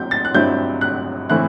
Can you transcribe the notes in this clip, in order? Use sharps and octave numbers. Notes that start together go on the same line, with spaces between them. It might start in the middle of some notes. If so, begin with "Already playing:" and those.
Already playing: F#3 C4 G6
A6
F#6
G2 F#3 C4 E4 G6
F#6
A2 E3 A3 C4 E4 F#6